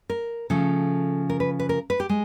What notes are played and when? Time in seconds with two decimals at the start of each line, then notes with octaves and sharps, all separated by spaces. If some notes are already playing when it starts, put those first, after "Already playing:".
0.10 A#4
0.50 C#3 F3 A3 A4
1.30 A#4
1.40 B4
1.59 B4
1.69 A#4
1.90 B4
2.00 G4
2.09 G#3